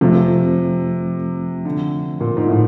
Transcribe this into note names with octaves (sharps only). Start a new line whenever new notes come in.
C3 F3 A3 C4 F4
D3
A#2
G#2
A2